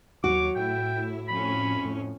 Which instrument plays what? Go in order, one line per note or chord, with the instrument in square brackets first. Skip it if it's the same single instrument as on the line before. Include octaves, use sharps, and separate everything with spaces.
[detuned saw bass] D#2 [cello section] F#3 C#5 [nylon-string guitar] F#4 [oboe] D6
[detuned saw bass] A2 [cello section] E4 [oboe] G5
[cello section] F2 C#4 [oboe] B5
[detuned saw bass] A2